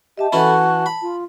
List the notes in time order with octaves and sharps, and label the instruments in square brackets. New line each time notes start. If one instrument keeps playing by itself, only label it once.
[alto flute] G4 [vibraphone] D#5 E5 A5
[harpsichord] E3 C#4 E4 [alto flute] F#4 [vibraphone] A4 A5 B5
[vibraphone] A5
[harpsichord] B5
[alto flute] F4